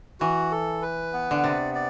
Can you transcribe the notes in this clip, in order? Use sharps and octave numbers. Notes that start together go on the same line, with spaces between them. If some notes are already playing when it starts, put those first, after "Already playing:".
E3 F#4
A4
B4
B3
D3
C3 D5
D5